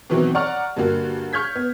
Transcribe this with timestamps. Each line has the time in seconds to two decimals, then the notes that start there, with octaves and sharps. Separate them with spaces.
0.10 B2 D#3 E3 F#3 C4
0.35 D5 F#5 A#5 C#6 F6
0.77 G2 D3 A#3 F#4
1.33 C#6 F6 G6 G#6 B6
1.55 B3